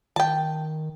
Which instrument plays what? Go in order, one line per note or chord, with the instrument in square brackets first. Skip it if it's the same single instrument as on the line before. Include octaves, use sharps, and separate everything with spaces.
[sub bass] D#3 [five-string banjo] G5 A5